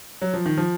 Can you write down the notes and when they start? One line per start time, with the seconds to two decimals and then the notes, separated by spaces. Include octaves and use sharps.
0.22 F#3
0.34 F3
0.46 D#3
0.58 F3